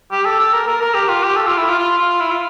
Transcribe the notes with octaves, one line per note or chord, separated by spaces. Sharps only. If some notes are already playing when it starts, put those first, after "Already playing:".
G4
A4
A4
A#4
A#4
A#4
G4
F4
G4
A4
F4
E4
F4
F4
F4
E4
F4